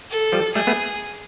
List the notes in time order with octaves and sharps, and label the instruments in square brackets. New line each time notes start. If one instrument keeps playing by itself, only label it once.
[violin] A4
[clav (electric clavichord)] F3 G3
[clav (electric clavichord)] G3 A3 [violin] G#4
[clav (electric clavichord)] A3 B3